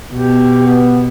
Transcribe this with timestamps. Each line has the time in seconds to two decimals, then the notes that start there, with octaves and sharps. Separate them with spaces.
0.14 B2 G4
0.66 B3